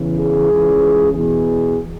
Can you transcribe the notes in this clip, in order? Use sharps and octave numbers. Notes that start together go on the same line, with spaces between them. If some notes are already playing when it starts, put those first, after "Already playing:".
Already playing: E2 C#3 E3
G#4
C#2 C#3 E3
E2 B2 G#4